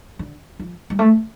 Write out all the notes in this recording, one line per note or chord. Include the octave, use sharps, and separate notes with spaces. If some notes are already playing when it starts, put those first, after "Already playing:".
D3
F3
G3
A3